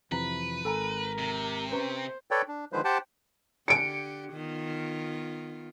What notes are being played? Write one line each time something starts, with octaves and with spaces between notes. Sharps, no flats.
F2 C3 E3 B4 A#5
G#1 A4 A#4 G#5 A#5
C3
C#4 B4 C5 A#5
A4 B4 C#5 D5 G5
D4
D3 D#3 F3 G#3 B4 C5
G4 C5 F#5 G5 A5
D3 G4 C#7 D7
D#3 B3 F4